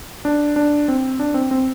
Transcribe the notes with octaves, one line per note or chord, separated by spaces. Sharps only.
D4
D4
C4
D4
C4
C4